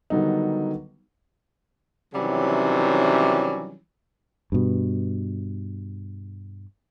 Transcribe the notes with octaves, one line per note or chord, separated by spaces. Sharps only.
D3 D#3 F#3 G3 B3 D#4
C3 D#3 E3 F#3 G3 C#4
G2 B2